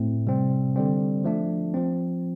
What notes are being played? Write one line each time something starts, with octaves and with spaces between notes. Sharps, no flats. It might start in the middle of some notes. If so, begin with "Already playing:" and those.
Already playing: A2 A3 C4
C3 G3 C4
D3 G3 C4
F3 A3 D4
F3 C4